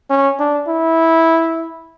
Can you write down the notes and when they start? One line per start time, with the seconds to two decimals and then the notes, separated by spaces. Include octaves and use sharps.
0.10 C#4
0.39 D4
0.68 E4